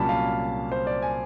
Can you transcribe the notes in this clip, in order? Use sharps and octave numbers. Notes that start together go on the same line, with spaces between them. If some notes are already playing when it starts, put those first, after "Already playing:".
Already playing: C2 A#2 F#3 A#3 C#4 A5 B5
F5
C5
D5
G#5